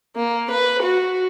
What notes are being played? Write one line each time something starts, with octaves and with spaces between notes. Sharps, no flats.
A#3
B4
F#4